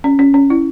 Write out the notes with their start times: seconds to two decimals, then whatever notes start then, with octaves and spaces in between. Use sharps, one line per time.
0.04 C#4
0.19 C#4
0.34 C#4
0.50 E4